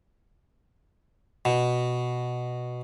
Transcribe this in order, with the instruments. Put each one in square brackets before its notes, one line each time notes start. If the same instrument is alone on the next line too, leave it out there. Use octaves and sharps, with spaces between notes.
[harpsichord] B2